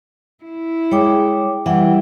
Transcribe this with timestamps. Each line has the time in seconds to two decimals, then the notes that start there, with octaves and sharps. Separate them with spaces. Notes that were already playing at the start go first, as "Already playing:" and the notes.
0.44 E4
0.91 G#3 C#5 G5 D6
1.66 E3 G3 E5 F#5 G5